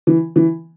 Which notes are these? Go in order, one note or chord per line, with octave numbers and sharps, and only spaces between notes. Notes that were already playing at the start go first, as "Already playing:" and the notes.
E3
E3